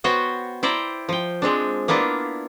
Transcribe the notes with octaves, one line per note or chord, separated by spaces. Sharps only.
B3 F#4 C5 C#5 G5
E4 C5 D5 G5 A#5
F3 G5
F3 G#3 C4 D4
A#3 B3 D4 E4 F4